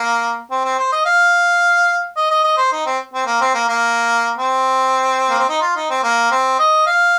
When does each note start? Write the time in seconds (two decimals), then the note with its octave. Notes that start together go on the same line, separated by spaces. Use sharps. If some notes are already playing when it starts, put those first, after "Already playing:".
Already playing: A#3
0.51 C4
0.64 C4
0.78 C5
0.92 D#5
1.05 F5
2.17 D#5
2.31 D#5
2.44 D#5
2.57 C5
2.72 D#4
2.86 C4
3.14 C4
3.26 A#3
3.41 C4
3.54 A#3
3.68 A#3
4.38 C4
5.30 A#3
5.39 C4
5.49 D#4
5.61 F4
5.76 D#4
5.90 C4
6.04 A#3
6.31 C4
6.59 D#5
6.87 F5